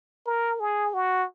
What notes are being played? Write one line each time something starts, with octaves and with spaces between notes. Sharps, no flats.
A#4
G#4
F#4